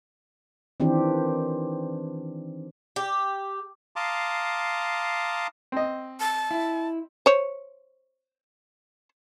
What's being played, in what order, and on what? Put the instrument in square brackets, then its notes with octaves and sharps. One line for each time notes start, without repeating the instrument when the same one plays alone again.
[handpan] D#3 E3 C4 D4 G4
[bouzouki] G4
[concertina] F5 A5 A#5 C6 D6 D#6
[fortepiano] C4 D#5
[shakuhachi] A5
[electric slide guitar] E4
[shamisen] C5 C#5